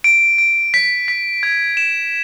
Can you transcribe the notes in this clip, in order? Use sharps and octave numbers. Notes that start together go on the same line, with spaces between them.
D7
D7
B6
B6
G#6
E7